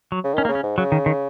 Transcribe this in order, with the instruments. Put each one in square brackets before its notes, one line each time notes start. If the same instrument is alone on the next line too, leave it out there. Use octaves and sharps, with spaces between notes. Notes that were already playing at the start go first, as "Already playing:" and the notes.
[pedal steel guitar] F#3
[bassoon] C#3
[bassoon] D#3 [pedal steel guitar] C#4
[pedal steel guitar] A#3
[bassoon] C#3
[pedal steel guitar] C#4
[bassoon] G#2
[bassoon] C#3 [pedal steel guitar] F#3
[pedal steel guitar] D#3
D#3